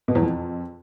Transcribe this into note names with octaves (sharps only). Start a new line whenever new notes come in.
B2
E2
F2